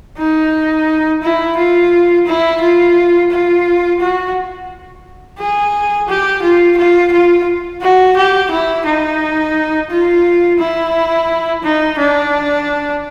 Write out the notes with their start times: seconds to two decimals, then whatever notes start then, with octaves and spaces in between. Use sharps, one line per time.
0.18 D#4
1.23 E4
1.57 F4
2.26 E4
2.61 F4
3.30 F4
4.00 F#4
5.39 G#4
6.09 G4
6.43 F4
6.77 F4
7.12 F4
7.82 F#4
8.17 G4
8.51 E4
8.86 D#4
9.90 F4
10.59 E4
11.63 D#4
11.98 D4